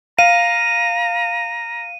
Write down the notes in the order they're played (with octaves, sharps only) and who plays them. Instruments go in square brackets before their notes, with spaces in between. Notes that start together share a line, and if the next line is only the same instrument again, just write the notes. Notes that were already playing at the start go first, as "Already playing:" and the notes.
[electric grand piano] F5 [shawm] A#5 [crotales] D#7